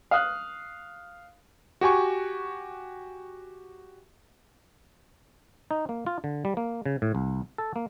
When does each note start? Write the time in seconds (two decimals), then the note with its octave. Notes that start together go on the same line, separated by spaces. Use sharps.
0.11 F5 D#6 F#6
1.81 F#4 G4 G#5 C#6
5.71 D#4
5.89 A#3
6.06 F4
6.24 D3
6.45 G3
6.57 A#3
6.86 C#3
7.02 A2
7.15 C2
7.58 A4
7.76 A#3